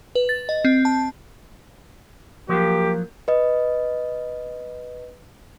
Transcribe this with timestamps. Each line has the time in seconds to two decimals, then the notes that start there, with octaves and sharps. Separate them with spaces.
0.15 B4
0.29 A6
0.49 D#5
0.65 C4
0.85 A5
2.49 F3 F#3 A#3 G4
3.28 B4 D#5